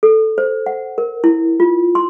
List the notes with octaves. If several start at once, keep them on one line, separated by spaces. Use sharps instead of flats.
A4
C5
F#5
A#4
E4
F4
C6